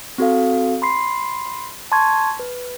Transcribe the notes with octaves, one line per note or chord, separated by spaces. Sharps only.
C4 F#4 A4 F5
B5 C6 C7
A5 C6 C#6 G#6
B4